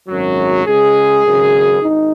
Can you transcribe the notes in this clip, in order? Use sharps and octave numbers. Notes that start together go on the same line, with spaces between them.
G#1 F#2 F#3
C#2 C#3 G#3 G#4
G#1 F#2 C#3
G#1 D#4